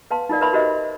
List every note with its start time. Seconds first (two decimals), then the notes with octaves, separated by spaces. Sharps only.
0.11 B4 F5 A5 C6
0.29 D#4 F4 A#4 D5 F5
0.41 A#4 B4 E5 F5 B5 C6
0.53 F#4 G4 A#4 C5 D#5 E5